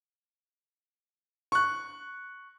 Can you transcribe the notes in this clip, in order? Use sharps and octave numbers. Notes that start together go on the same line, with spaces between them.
C#6 F#6